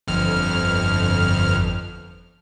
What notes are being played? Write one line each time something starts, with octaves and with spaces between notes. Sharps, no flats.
G1 F2 F6